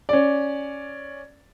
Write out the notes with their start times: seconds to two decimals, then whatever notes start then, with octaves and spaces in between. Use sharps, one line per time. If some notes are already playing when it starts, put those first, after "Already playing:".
0.09 C#4 D5